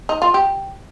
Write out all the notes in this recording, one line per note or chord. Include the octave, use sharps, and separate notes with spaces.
D#4
F4
G4